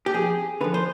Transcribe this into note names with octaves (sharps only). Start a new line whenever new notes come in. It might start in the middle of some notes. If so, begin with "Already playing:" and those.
G4
F2 G#4
D3 F3 B4
C5